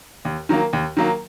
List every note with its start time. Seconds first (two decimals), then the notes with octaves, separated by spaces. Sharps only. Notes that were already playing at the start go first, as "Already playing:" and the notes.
0.25 D#2
0.49 D#3 F#3 A#3
0.73 D#2
0.97 D#3 F#3 A#3